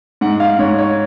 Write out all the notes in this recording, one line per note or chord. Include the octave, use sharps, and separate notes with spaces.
G#2 F#5
F5
G#2 C#5
C#5